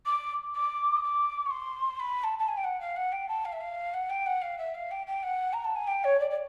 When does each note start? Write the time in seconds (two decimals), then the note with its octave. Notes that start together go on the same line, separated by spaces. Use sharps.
0.06 D6
0.54 D6
0.96 D#6
1.03 D6
1.46 C#6
1.51 C6
2.00 B5
2.24 A5
2.39 A5
2.48 G#5
2.57 G5
2.64 F#5
2.80 F5
2.96 F#5
3.12 G5
3.28 A5
3.45 F5
3.52 E5
3.61 F5
3.94 F#5
4.10 G5
4.26 F#5
4.42 F5
4.58 E5
4.74 F5
4.91 G5
5.07 G5
5.23 F#5
5.53 A#5
5.64 A5
5.76 G#5
5.87 G5
6.04 C#5
6.20 D5
6.30 D5